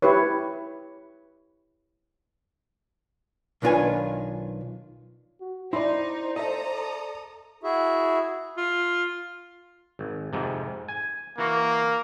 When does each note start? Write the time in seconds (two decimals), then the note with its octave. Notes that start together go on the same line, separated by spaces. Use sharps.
0.02 E4 G4 B4 C#5
3.62 B1 D#3 D4 F4 B4 G#5
5.40 F#4
5.73 D#4 E4 C5 D5 C6
6.36 A4 D#5 E5 A#5 D#6
7.63 E4 F#4 G#4 E5
8.57 F4
9.99 G#1
10.33 F2 G#2 C3
10.89 G#5
11.38 E3 A#3 F#4 F5